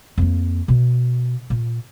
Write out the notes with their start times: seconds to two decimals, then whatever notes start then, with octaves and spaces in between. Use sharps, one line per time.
0.18 F2 A#3
0.68 B2
1.50 A#2